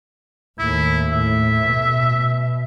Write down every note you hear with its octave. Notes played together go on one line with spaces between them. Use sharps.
D#2 A2 E4
A2 E5
B2